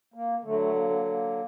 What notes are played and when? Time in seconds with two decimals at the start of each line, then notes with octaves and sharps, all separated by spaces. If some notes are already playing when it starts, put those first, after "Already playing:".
0.14 A#3
0.44 D3 F#3 A3
0.59 A3
0.74 A#3
0.89 A#3
1.06 A#3